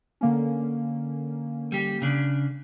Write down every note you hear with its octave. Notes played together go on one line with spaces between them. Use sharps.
D3 A#3 C#4
G3 G4
C#3 D4